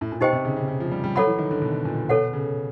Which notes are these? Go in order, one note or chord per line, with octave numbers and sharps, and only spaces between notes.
A2
A#2
B2 D#4 G4 C5 D#5 G5
C3
C#3
C#3
C#3
F3
G3
G3
F#3 A4 C#5 F#5 B5
E3
D#3
D3
B2
A#2
B2 A4 C#5 F#5
C#3